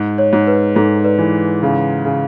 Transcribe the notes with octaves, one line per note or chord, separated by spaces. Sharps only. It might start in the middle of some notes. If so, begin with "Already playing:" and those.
Already playing: G#2
C#5
G#2
B4
G#2 A4
B4 D5
E3
C#3
C#3